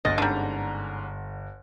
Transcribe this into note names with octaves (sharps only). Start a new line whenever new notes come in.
G1 D2 D#5 A6
G#2 D3 G3 C#4 A#5